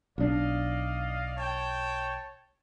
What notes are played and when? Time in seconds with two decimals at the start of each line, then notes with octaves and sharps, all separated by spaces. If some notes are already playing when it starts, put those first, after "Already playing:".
0.18 B1 D4 D5 D#5 F5
1.37 C#5 G5 A5